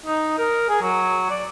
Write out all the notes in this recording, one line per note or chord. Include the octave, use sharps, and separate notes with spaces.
D#4
A#4
G#4
F#3
D5